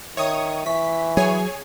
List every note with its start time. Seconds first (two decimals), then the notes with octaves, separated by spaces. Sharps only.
0.17 D#3 C#5 E5 C#6 D#6
0.66 E3 E5 C#6 B6
1.17 F#3 G#4 C#5 G#5